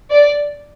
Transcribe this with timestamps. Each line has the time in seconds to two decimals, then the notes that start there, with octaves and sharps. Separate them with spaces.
0.11 D5